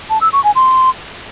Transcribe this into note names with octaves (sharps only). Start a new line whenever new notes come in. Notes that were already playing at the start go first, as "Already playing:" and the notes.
A5
E6
C#6
G#5
C6